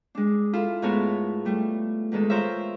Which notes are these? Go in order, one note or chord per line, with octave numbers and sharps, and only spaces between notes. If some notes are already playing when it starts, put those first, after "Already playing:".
G#3 D4
E4 F4 A4
G#2 A3 B3 A#4 C#5 A5
G3 A3
E2 D#3 G#3 A4
F4 A#4 C5 C#5 E5